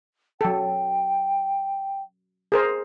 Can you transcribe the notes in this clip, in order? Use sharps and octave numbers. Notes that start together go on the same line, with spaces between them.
F#3 A4 G5
G#4 A#4 C5